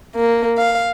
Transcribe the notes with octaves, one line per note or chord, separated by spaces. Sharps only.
A#3
F5